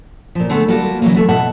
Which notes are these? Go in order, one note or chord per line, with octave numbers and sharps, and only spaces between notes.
A#2 F3
D3 G#3 A3 B3
G3 A#3 F#4 A4
C#3 E3 F#3 A#3
A3 B3
B2 E5 F#5 A5